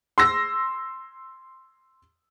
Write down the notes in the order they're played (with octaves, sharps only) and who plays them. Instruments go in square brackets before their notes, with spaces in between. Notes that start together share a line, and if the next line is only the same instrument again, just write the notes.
[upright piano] C6 E6 A#6